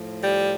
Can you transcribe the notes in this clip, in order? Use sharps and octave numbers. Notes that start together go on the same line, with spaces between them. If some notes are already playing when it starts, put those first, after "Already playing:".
Already playing: A2 F3
G3